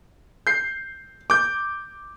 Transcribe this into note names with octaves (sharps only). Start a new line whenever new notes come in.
G6 C7
D6 G6